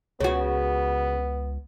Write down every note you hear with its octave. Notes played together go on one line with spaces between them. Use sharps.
C#2 C#3 B3 F#4 C#5 F#5